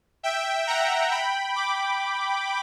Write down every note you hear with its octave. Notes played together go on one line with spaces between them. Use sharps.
E5 G5
F#5 A#5
G5 B5
B5 D6